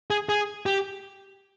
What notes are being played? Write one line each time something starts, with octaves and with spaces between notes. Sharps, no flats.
G#4
G#4
G4